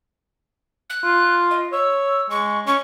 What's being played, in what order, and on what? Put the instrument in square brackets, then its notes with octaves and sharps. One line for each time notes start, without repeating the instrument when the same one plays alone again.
[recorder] F#6
[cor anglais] F4
[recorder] D#5
[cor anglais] C#5 [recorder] E6
[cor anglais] G#3 [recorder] C#6
[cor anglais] C#4 [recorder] C#6